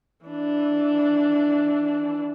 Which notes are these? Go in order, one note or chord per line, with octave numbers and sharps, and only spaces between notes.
E3 D4